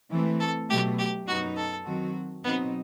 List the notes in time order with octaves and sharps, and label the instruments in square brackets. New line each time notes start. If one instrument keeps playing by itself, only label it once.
[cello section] E3 A3 C4
[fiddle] A4
[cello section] B2 F#3 A3 [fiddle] G4
[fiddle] G4
[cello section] F#2 F#3 B3 D#4 [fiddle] F#4
[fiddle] A4
[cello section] D#3 F#3 C4 F#4
[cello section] B2 F#3 C4 D#4 [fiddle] B3